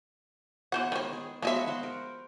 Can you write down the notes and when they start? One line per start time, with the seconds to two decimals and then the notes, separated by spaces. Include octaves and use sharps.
0.72 E3 B3 C5 F#5
0.92 D#3 G#3 C5
1.13 G#4
1.42 F3 G#3 B3 F#4 D#5 E5
1.67 C5 F#5 C6
1.83 A#4